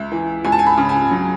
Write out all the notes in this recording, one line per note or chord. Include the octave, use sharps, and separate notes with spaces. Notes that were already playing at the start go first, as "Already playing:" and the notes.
Already playing: C#2 E5
E3
C#2 G#5
A5
G#5
B5
C#3
G#5
F#3